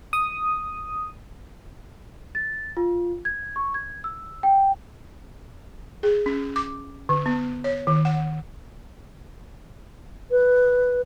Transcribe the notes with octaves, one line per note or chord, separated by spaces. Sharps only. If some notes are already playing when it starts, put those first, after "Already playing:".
D#6
A6
F4
G#6
C#6
G#6
E6
G5
G#4
C#4
D6
D3
B3
C#5
D#3
F#5
B4